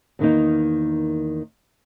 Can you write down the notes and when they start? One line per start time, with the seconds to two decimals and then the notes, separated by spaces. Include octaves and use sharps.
0.19 E2 D#3 A#3 D#4